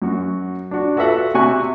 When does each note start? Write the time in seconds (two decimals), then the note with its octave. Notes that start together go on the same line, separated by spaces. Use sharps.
0.02 F#2 F#4
0.71 D4 F#4
0.96 F4 F#4 A4 B4 E5 F#5
1.34 C3 F#4 E5 G#5 C#6 F#6